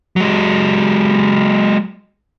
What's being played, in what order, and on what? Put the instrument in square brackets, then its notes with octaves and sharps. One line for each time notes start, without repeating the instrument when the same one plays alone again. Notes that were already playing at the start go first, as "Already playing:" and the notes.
[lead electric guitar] F#3 G#3